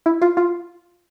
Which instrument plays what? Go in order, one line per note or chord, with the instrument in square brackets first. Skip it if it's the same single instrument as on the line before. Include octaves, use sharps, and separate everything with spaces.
[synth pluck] E4
F4
F4